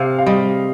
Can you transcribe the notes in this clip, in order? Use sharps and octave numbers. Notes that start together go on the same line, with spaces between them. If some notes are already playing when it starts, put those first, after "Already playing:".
Already playing: C3 F5
F5
G3 D#5